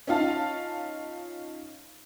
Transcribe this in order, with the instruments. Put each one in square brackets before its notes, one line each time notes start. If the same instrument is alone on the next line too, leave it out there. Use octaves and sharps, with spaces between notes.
[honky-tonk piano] C#4 D#4 F4 F5 A5